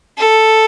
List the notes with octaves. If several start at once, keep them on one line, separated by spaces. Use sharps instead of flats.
A4